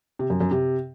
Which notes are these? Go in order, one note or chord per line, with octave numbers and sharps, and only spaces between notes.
C3
F#2
F#2
C3